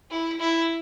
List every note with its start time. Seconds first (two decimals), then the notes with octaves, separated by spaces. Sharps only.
0.11 E4
0.40 E4